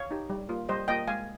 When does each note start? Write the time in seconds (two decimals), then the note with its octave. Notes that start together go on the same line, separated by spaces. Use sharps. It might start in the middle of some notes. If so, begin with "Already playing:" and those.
Already playing: C#5 F5
0.11 D#4 G4
0.30 G3
0.49 A#3 F4
0.69 G3 C5 D#5
0.88 A#3 F4 D#5 G5
1.08 G#3 F5 G#5